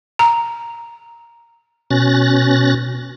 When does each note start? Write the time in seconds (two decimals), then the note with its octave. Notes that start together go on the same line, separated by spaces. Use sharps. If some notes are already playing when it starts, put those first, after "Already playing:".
0.19 A#5
1.91 B2 C#4 F#6 A6 A#6